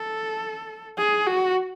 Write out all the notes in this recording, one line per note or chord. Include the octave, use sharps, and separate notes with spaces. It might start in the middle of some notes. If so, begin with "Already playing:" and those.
Already playing: A4
G#4
F#4